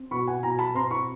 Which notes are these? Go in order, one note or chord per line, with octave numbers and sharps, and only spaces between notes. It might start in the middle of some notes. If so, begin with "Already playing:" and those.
Already playing: C4
B2 B5 C#6
F#5 G#5
B2 G#5 A#5
A5 B5
C4 A#5 C6
B5 C#6